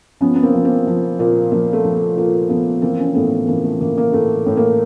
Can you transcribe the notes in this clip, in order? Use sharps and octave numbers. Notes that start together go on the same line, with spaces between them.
F3 B3 C#4
B3
A#3 C4
F3
A#3 C4
F3
A#2 A#3
F3 A#3
A3
F3
A3
A#2 A#3
F3 A3 B3
E3 A#3 C4
C#4
C4
A2 A3 B3
E3 A#3
A3
E3 A#3
A#3
A2 A3
A2
A#3